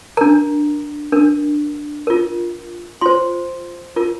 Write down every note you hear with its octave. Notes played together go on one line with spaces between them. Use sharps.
D4 A#4 A#5
D4 A#4
F4 A#4
F4 C5 C6
F4 A#4